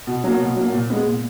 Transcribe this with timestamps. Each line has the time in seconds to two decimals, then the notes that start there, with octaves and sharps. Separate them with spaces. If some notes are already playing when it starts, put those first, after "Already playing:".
0.07 B2
0.24 F#3 A#3
0.40 B2
0.56 F#3 A#3
0.72 A#2
0.90 G#3 B3
1.06 A#2